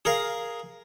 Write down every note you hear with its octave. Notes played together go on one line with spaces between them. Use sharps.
G#4 A#4 F5